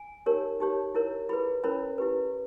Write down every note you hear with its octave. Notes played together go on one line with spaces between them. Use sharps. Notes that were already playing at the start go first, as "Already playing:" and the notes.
Already playing: G#5
D#4 G4 A#4 C#5
D#4 G4 C#5
E4 A#4 C#5
E4 G#4 B4 B5
C#4 E4 A#4 C#5 B5
E4 G4 B4